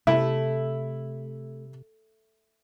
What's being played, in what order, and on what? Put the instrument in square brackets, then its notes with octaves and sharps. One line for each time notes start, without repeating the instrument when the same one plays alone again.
[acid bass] C3 [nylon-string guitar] A3 [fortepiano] E4 E5